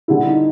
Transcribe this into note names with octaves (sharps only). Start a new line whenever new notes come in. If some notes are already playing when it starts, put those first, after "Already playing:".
D3 G3 E4
D#4